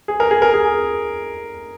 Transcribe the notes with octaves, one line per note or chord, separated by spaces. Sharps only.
G#4
A#4
G#4
A#4
G#4